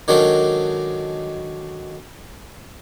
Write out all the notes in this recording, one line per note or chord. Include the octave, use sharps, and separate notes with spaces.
D#3 F#3 G#3 D4 A4 A#4